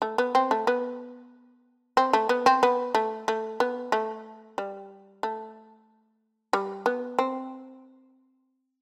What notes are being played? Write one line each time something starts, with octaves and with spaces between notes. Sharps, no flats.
A3
B3
C4
A3
B3
C4
A3
B3
C4
B3
A3
A3
B3
A3
G3
A3
G3
B3
C4